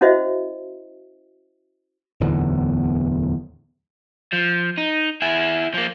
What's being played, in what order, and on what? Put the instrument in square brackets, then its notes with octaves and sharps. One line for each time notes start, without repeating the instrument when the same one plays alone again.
[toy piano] C#4 E4 F#4 C5 D#5 E5
[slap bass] D1 E2 D3 B3
[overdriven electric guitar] F3
D#4
E4 G#4
F3 A#3